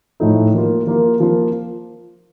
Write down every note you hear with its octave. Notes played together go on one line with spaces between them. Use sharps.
A2 F3 A3 D#4 A4
F3 A#3 F4
F3 A#3 F4
F3 A#3 F4